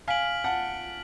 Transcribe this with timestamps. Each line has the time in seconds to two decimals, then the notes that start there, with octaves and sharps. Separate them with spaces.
0.08 F5 G#5 F6 B6 D7 F#7
0.44 F#5 A5